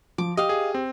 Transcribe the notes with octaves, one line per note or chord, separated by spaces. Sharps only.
F3 D6
G4 D#5 F5
G#4
C4